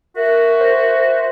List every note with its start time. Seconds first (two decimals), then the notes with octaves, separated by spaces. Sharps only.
0.16 F#4 A#4 E5
0.61 C5